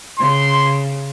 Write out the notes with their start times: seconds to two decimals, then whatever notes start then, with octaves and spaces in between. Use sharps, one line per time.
0.19 C#3 C6